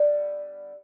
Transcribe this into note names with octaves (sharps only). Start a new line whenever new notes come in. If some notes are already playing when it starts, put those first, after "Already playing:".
Already playing: D3 G3 B3